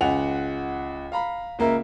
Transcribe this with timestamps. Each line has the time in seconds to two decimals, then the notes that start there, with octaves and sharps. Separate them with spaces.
0.01 C#2 F#5 G#5 F7
1.12 F5 A#5 B5
1.59 C#2 A#3 A#4 E5